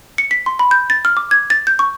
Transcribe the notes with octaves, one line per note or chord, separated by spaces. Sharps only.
C#7
B6
C6
B5
G6
A6
F6
D6
G#6
A6
G6
C#6